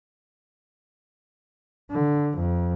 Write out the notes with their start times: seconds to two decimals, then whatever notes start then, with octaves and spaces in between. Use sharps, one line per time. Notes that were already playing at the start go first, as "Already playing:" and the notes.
1.91 D3
2.37 F2